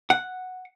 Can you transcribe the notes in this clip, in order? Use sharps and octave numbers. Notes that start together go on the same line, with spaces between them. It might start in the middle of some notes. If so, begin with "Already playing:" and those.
F#5